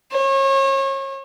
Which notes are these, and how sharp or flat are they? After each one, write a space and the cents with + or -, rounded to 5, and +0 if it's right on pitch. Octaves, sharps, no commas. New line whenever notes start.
C#5 -35